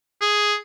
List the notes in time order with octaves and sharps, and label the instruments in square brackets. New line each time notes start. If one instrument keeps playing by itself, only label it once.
[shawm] G#4